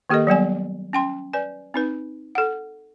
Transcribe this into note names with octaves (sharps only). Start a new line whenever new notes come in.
D#3 A#3 G4 A4 A#4 D#5
F#3 G3 B3 G#5
C#4 G5 C6
B4 D5 G#5
C4 D#4 B4
A4 F#5